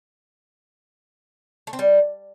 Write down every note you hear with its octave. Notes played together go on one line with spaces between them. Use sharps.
A3
C4
G3